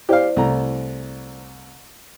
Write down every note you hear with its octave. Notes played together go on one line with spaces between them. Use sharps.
E4 G4 C5 D5 F5
C2 A3 A#5